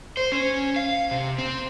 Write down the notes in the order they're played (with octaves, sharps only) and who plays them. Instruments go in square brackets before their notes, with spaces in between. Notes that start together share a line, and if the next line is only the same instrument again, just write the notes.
[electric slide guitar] C5
C#4
F5
C3
C4